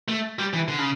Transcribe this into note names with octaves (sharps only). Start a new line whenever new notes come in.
A3
G3
E3
D3
C#3